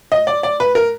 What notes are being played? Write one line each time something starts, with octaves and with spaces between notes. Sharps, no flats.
D#5
D5
D5
B4
A#4